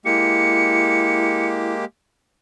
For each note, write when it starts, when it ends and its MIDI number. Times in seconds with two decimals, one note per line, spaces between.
0.05 1.85 56
0.05 1.85 58
0.05 1.74 64
0.05 1.85 67
0.05 1.47 97